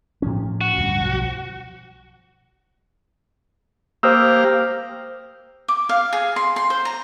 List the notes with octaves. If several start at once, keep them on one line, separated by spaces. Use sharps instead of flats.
A2 F3 C#4
F#4
D2 G2
B1 F3
A#3 G4 C5 F5 D#6 E6
D6
F5
G#4
C6
C6
C5
A#5